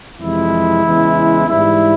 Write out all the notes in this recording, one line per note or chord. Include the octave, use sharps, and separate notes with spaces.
F2 C3 E3 G#3 E4
E2 C#3 E3 G#3
G#2 E3 G3 E4